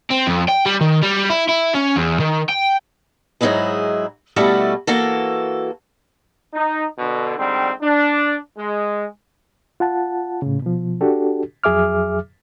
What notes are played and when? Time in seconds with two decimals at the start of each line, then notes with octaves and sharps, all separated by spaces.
0.11 C4
0.27 F2
0.49 G5
0.66 G3
0.81 D#3
1.02 G3
1.30 E4
1.49 E4
1.74 C#4
1.96 E2
2.20 D#3
2.49 G5
3.41 G#2 F#3 C4 D#4 E4 G#4
4.36 B2 G3 A3 E4 F#4 A4
4.87 E3 A#3 F#4 A4
6.53 D#4
6.99 B2 D3
7.38 G#2 D3 G3 C4
7.82 D4
8.57 G#3
9.80 F4 F#5 A5
10.42 A2 C#3
10.62 B2 F3
11.01 D4 F#4 G4 A4
11.64 F2 F#3 G#4 E5 D6 F6